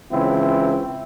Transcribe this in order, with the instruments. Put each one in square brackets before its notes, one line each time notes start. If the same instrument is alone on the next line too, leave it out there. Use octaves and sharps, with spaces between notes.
[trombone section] C#2 C#3 E3 C4 E4